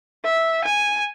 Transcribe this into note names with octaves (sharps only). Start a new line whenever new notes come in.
E5
G#5